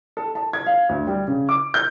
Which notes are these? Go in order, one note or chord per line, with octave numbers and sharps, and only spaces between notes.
A4
A5
G#6
F5
D2
G3
C#3
D6
G6